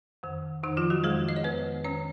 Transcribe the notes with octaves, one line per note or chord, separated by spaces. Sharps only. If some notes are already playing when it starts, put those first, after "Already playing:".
F2 D#3
F2 D#3 D#4
F3 F4
F#3 F#4
F2 D#3 G#3 G#4
D#5
C#5
F2 D#3 B3 B4
D#3 C#4 C#5